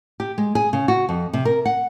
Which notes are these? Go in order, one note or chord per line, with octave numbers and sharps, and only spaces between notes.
G4
G#3
G#4
C#3
F#4
F2
C3
A#4
F#5